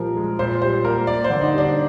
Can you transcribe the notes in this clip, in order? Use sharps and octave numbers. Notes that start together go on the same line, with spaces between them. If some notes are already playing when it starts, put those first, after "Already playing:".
Already playing: A#2 F3 G3 A#4
G#3
A#2 C5
G3 C5
A#3 A#4
A#3 D5
C5
D3
D#4
G3
D4